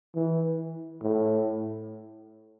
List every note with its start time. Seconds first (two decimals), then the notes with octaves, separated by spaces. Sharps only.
0.15 E3
1.02 A2